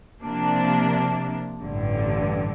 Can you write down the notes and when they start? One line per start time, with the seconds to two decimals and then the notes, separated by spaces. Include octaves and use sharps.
0.23 C3 F3 A#3 D4
1.61 A1 G2 D3